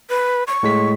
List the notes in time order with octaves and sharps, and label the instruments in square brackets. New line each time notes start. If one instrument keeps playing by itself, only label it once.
[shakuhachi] B4
C#6
[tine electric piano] A2 G#3 B6